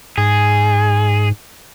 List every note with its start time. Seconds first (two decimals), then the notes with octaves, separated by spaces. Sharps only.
0.18 G#2 G#4